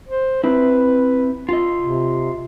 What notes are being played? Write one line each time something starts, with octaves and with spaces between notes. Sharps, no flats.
C5
C4 E4 B4
F4 D#5
C3